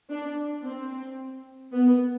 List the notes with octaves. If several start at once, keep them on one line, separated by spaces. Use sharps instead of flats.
D4
C4
B3